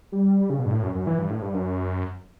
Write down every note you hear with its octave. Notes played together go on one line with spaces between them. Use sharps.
G3
C#3
B2
G2
A2
F#2
F#2
E3
G2
A2
G2
F#2